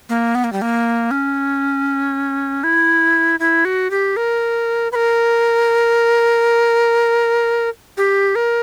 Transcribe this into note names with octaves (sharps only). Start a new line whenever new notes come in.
A#3
B3
A#3
G3
A#3
C#4
E4
E4
F#4
G4
A#4
B4
A#4
G4
A#4